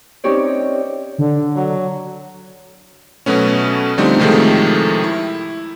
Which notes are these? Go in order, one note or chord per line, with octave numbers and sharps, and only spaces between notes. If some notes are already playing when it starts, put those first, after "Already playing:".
C4 C#4 D#4 G4 C#5 D5
D3
F#3
B2 F#3 A3 B3 C#4
D3 F3 G3 A3 C4 D#4
A2 C3 D#3 F3 G#3 A3
E4